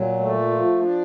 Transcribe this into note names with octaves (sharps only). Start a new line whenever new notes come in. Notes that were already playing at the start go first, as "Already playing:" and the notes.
Already playing: A#2 F#3
A3
F3
D4